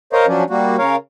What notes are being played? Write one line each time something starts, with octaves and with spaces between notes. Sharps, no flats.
A#4 C5 C#5 D#5 F5
F3 F#3 C#4 D4
G3 A#3 F#4
C#3 A#4 C#5 F5